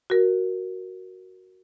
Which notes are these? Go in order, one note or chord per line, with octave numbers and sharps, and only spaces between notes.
F#4 A#4